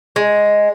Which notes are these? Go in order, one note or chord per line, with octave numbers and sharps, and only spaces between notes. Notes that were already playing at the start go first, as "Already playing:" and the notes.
G#3